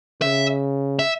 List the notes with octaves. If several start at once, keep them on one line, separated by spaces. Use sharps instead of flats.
C#3 E5
E5